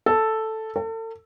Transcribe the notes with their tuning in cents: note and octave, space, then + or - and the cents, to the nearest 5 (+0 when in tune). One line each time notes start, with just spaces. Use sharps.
A4 +0
A4 +35